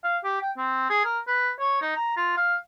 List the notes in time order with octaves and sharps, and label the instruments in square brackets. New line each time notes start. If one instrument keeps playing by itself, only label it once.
[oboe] F5
G4
G5
C4
G#4
A#4
B4
C#5
D#4
A#5
F4
F5